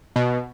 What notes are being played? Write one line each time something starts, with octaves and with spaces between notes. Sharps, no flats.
B2